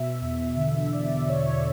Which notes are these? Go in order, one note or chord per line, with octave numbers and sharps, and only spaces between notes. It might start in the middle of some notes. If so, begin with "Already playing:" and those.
Already playing: B2 E5
E2
D3
E2 D5
E2 C#5